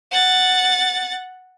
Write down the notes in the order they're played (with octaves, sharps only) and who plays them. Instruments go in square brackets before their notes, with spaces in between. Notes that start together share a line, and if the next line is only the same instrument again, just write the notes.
[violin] F#5 A6